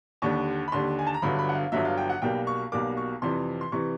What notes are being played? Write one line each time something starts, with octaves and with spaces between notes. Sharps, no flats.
D#2 D3 G3 C#6
B5
D#2 D3 G3 C6
G#5
A5
A#5
G1 G2 D3 F#3 B5
B5
F#5
F5
G1 G2 D3 F#3 E5
F5
G5
F#5
B1 B2 G3 A#3 G5
C#6
B1 B2 G3 A#3 D6
C#6
F2 C3 E3 G3 C6
C6
C3 E3 G3 C#6